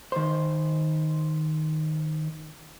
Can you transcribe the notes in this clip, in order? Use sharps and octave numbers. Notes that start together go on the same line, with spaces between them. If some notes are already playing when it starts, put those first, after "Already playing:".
D#3 C5